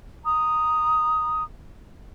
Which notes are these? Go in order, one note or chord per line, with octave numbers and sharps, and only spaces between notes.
A#5 D#6